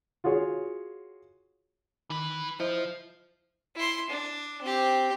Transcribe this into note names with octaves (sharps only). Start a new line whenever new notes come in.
F4 F#4 G#4 C#5
D#3 E3 B4
F3 E4 C5 D#5 E5
E4 C6
D4
C4 G4